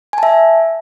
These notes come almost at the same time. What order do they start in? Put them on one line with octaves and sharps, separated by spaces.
G#5 A5 E5